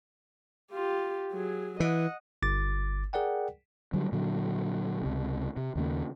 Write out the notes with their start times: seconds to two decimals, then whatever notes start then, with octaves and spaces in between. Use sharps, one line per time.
0.72 F4 G4
1.32 F#3 G#4
1.80 E3 D#5 F#5
2.42 G1 D6 A6
3.13 G#4 A#4 D5 F#5 G5
3.93 D3 F#3 G3
4.12 A#2 D3 F#3
5.02 C#2 C3
5.57 C3
5.75 D#2 C#3 A#3